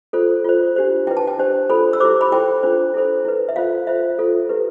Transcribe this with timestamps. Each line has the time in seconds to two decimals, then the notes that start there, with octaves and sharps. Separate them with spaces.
0.13 F4 A4 C5
0.45 F4 C5
0.76 D4 G4 C5
1.07 E4 B4 G5
1.17 A5
1.27 G5
1.39 D4 G4 C5
1.70 F4 A4 C5 B5
1.93 E6
2.00 E4 G4 C5 D6
2.21 B5
2.32 E4 A4 C5 G5
2.63 D4 F4 C5
2.94 E4 A4 C5
3.25 E4 B4
3.49 E5
3.56 F4 A4 C5 F5
3.87 F4 C5 E5
4.19 F4 A4 C5
4.49 E4 G4 B4